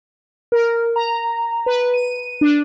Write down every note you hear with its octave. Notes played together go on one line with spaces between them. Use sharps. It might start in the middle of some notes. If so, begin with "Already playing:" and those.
A#4
A#5
B4
D#7
D4